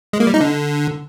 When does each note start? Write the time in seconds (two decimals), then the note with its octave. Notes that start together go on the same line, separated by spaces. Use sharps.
0.13 G#3
0.20 A#3
0.27 G3
0.34 D#4
0.41 D3